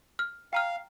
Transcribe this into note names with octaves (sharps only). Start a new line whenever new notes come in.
F6
F5 G5 A#5 F6